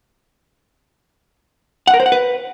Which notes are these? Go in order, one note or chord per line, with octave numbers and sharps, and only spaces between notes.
F#5
A#4
C5
F#5
B4